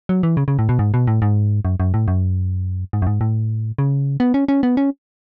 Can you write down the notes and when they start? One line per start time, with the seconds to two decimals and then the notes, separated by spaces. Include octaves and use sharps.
0.09 F#3
0.23 E3
0.37 C#3
0.48 C#3
0.59 A2
0.69 B2
0.79 G#2
0.94 B2
1.07 A2
1.22 G#2
1.65 F#2
1.80 F#2
1.94 A2
2.08 F#2
2.93 G#2
3.02 F#2
3.07 G#2
3.21 A2
3.79 C#3
4.20 B3
4.34 C#4
4.48 C#4
4.63 B3
4.77 C#4